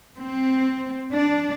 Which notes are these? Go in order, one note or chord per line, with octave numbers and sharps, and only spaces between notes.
C4
D4